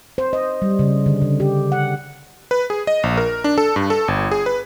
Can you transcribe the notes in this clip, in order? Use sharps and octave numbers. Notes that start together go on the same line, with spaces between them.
C5
D#5
G3
C#3
D3
C#3
G4
F#5
B4
G#4
D#5
A#1
A#4
D4
A4
G2
A4
G1
G#4
B4